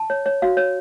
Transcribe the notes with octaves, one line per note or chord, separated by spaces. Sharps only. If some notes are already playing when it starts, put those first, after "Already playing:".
Already playing: A5
C#5
C#5
F#4 F5
C#5